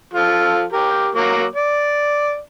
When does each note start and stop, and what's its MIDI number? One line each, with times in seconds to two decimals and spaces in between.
0.14 0.64 53
0.14 0.64 65
0.14 0.64 69
0.73 1.09 67
0.73 1.09 70
1.15 1.45 54
1.15 1.45 58
1.15 1.45 86
1.55 2.38 74